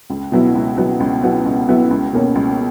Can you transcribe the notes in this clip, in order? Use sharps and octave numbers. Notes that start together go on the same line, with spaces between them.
C#2
B2 F#3 B3 E4
C#2
B2 F#3 B3 E4
C#2
B2 F#3 B3 E4
C#2
B2 F#3 B3 E4
C#2
B2 A#3 C#4
C#2